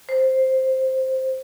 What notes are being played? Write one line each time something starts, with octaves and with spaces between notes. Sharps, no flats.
C5